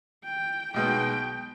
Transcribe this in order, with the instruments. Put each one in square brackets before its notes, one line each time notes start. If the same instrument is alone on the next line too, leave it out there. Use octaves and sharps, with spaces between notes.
[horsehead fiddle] G5
[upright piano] B1 B2 G#3 B3 [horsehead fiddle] G5